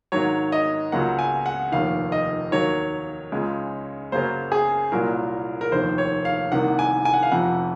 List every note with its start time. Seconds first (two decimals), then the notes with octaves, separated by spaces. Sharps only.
0.12 G#1 G#2 D#3 F#3 C#5
0.52 D#5
0.92 C#2 C#3 F#3 A#3 F#5
1.19 G#5
1.46 F#5
1.72 F1 D#2 D#3 F5
2.12 D#5
2.52 D#2 D#3 F#3 A#3 C#5
3.32 C#2 C#3 G#3
4.12 F#2 C#3 F#3 A#3 C5
4.52 G#4
4.92 C2 A#2 F#3 A#4
5.61 A#4
5.72 F1 D#2 D#3 C5
5.98 C#5
6.25 F5
6.52 C2 C3 D#3 A#3 F#5
6.79 G#5
7.05 G#5
7.14 F#5
7.23 F5
7.31 F1 F2 C3 F#5